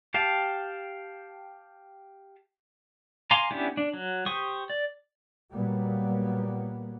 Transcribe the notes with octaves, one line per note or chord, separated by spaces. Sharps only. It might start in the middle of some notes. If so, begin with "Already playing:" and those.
G4 F5 G5 A5
F5 G#5 A#5 C6 D6
B3 C#4 D4 E4 G4
D4
F#3
G4 C5 C#6 D#6
D5
A#2 F#3 G3 A#3 B3